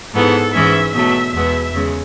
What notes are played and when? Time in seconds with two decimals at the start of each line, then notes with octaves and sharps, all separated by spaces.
0.14 G#2 E3 B3 A4
0.54 G#2 E3 G#3 C#4 E5
0.94 B2 F#3 A3 E5
1.33 E2 B2 G#3 B3 E5
1.73 E2 C#3 G#3